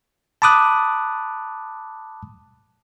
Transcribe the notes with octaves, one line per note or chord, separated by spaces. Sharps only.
A5 B5 D6 D#6 F#6